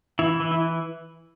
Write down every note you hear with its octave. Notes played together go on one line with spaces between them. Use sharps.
E3 E4
E3
E4